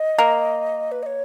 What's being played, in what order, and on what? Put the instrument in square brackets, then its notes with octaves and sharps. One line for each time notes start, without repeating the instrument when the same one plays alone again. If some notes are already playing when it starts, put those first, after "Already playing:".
Already playing: [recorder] D#5
[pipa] A#3
[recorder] B4
D#5
C#5